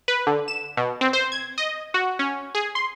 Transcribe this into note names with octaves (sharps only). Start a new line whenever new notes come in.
B4
D3
E7
B2
C4
C5
G#6
D#5
F#4
C#4
G#4
C6